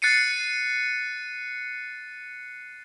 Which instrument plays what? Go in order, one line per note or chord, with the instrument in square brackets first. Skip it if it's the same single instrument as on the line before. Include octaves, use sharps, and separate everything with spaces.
[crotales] F#6 A6 C7 C#7 D#7